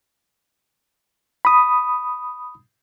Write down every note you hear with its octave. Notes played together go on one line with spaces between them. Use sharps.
B5 D#6